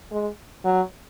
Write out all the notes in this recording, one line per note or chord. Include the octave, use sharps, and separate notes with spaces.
G#3
F#3